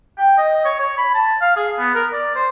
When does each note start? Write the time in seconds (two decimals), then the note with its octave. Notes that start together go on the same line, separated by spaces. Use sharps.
0.18 G5
0.38 D#5
0.65 C#5
0.80 C#5
0.97 B5
1.14 A5
1.41 F5
1.57 G#4
1.78 B3
1.95 A#4
2.13 D5
2.36 C5